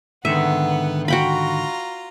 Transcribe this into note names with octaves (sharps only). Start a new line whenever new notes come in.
G#2 D3 D#3 B3 E5 F#5
F4 F#4 G5 A#5 B5